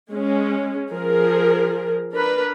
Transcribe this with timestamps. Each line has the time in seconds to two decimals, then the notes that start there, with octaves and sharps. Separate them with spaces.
0.11 G#3 C#4
0.91 F3 G#4 A#4
2.13 D4 A#4 B4